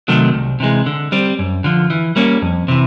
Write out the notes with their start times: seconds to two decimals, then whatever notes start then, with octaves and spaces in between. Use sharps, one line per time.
0.08 C3 D#3 F#3 A3
0.34 C2
0.60 C3 E3 G#3
0.86 D3
1.12 G3 C4
1.39 F#2
1.64 D3 F3
1.90 E3
2.16 G3 A#3 C#4
2.42 F2
2.68 C3 E3